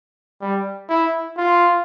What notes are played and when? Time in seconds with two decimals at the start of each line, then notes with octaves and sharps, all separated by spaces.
0.41 G3
0.89 E4
1.37 F4